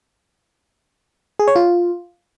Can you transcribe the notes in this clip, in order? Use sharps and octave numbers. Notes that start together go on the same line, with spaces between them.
G#4
C#5
F4